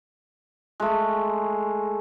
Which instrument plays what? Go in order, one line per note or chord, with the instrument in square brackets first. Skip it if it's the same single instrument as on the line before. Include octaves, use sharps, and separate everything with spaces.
[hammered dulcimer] G#3 A3